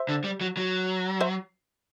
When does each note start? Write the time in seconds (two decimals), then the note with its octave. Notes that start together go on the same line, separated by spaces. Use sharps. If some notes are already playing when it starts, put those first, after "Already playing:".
Already playing: C5 E5
0.09 D3
0.24 G3
0.41 F#3
0.57 F#3
1.21 C5 E5